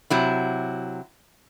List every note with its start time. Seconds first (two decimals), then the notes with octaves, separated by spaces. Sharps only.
0.10 C3 F#3 E4